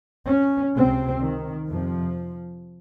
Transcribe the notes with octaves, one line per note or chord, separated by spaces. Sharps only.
C#4
C#2 C3 C4
D#3
F2 C3 F3